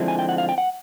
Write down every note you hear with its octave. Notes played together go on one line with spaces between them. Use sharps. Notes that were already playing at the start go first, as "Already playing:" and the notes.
Already playing: D3 F3 G#3 C4 E4
G#5
G5
F#5
F5
G5
F#5